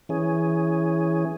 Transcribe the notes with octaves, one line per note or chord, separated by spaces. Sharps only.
E3 C#4 G#4